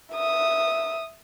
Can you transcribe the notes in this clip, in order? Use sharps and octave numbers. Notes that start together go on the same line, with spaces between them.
E5 D#6